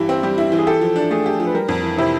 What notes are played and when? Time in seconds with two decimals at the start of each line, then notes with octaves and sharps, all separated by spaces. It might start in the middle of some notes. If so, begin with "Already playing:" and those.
Already playing: G2 E3 E4 G4
0.09 C4
0.23 G3 G4
0.38 E4
0.52 E3
0.58 G#4
0.67 G4 A4
0.81 F3
0.96 D4
1.11 A3 G#4
1.26 G4
1.40 F3
1.46 B4
1.54 G3 A#4
1.69 F2
1.83 E3
1.98 C3 E4